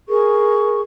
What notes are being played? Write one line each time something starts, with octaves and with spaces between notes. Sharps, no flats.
G#4 A#4 C#6